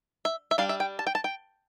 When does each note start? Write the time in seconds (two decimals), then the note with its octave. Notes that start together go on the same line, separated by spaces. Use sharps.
0.25 E5
0.51 E5
0.58 G3 D4 F5
0.69 E5
0.80 G5
0.99 A5
1.07 G5
1.15 A5
1.24 G5